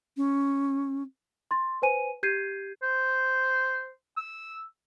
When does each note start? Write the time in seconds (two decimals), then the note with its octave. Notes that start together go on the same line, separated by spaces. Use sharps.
0.17 C#4
1.51 C6 A6
1.82 B4 C5 G#5 D#7
2.23 G4 G6 G#6 C7 D#7
2.83 C5
4.17 E6